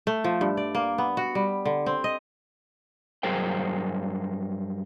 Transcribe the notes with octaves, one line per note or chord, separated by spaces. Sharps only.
A3
F3
G2
D5
A#3
B3
F#4
G3
D3
C4
D#5
G2 F#3 G#4 A#4 C5 G5